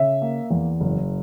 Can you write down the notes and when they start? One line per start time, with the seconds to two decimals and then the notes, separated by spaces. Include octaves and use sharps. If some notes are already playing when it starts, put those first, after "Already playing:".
Already playing: C#3 E5
0.22 A#3
0.51 E2
0.80 F#1